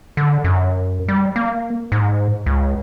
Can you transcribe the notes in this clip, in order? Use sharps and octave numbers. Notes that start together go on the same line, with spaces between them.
D3
F#2
G3
A#3
G#2
C#2